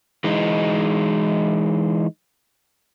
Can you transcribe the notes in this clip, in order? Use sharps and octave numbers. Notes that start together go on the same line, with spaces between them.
E3 G#3 D#4